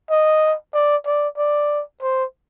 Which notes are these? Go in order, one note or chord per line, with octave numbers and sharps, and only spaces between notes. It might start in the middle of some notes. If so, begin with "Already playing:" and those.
D#5
D5
D5
D5
C5